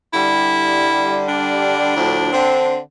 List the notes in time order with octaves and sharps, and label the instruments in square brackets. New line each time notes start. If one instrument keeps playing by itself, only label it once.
[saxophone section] D3 G3 [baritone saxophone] E4
[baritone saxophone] D4
[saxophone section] D2 A2 F3
D3 C4